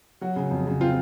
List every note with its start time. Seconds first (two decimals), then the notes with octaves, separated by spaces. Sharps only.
0.21 F#3 F#4
0.36 C#3
0.51 F2
0.67 C#3
0.81 C4 F4